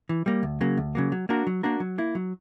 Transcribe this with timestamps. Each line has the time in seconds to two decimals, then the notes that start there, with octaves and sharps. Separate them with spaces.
0.09 E3
0.26 G3 A#3
0.43 D2
0.61 C#3 F#3 A#3
0.77 D2
0.95 C#3 F#3 A#3
1.12 F#3
1.29 A#3 D4 F#4 A#4
1.47 F#3
1.63 A#3 D4 F#4 A#4
1.80 F#3
1.98 A#3 E4
2.15 F#3